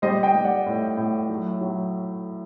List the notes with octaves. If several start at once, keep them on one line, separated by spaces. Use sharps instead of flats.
G3 C5 D#5
D#5 G5
G3
D5 F#5
A2
A2
F#3
F#3